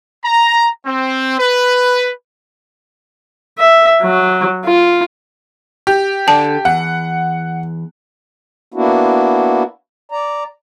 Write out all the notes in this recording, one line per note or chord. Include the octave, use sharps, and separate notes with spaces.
A#5
C4
B4
E5
F#3
F4
G4
D3 D5 A5
E2 F#5
A#3 B3 D4 E4 F#4
D5 A#5